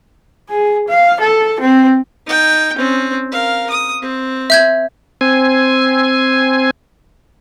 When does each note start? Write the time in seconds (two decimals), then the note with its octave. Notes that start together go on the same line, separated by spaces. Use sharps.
0.50 G#4
0.89 F5
1.21 A4
1.60 C4
2.26 D#4 G5
2.76 C4 C#4
3.32 A#4 F5
3.70 D#6
4.02 C4
4.50 E5 G6 G#6
5.21 C4 G#5